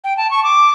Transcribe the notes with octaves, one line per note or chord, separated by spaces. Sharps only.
G5
A5
C#6
D6